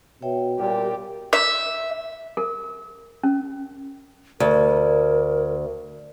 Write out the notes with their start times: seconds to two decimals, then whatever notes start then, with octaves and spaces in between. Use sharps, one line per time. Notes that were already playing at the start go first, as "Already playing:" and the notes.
0.22 B2 C#5 E5 G5
0.59 A#2 G3 G4 D5
1.33 E5
2.37 A4 A#4
3.23 C#4
4.40 D2 A#4